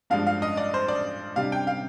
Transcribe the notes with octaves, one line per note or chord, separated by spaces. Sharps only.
G2 F3 G#3 D4 F5
F5
D#5
D5
C5
D5
C3 G3 D4 F5
G5
F5